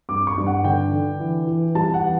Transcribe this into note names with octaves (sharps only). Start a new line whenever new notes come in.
G2 D6
C#6
G2
F#5
D3 G5
D3
E3
E3
G3 A5
F#5
E3